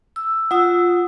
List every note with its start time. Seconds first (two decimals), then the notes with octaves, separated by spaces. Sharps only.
0.16 E6
0.51 F4 F#5 D#6 E6